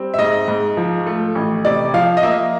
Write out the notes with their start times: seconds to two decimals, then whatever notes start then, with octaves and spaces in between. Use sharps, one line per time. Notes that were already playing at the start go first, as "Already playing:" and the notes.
Already playing: G3 C4
0.14 E5
0.18 G#2 D#5
0.48 G#2
0.77 F3
1.07 A3
1.35 A1
1.64 C3 D5
1.94 F3 F5
2.17 D#5
2.23 A#3 E5